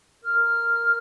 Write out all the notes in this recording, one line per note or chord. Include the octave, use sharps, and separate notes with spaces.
A#4 F6